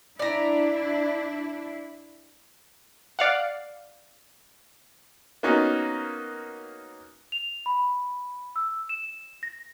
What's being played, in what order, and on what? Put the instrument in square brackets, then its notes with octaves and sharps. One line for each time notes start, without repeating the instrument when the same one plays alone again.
[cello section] D4 E4 [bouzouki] D5 A#5
[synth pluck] D5 F5 F#5
[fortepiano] A#3 B3 C#4 D#4 F#4
[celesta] F7
B5
E6
E7
A#6